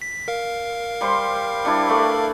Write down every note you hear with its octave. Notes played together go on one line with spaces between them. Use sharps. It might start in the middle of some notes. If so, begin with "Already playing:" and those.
B6
A#4 F5
G3 C5 C6
G3 D4 E4
A3 B4 D5